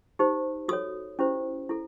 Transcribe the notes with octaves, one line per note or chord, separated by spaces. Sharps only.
D#4 G4 C5
F#4 A4 C#5 D#6
C#4 E4 G4 C5
E4 A4